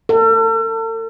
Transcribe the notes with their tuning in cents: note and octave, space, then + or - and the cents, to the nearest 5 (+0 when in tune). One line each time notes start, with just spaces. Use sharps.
A4 +40